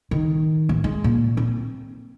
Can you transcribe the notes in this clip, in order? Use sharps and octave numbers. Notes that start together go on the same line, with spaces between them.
D#3
A1
G#3
A#2
C4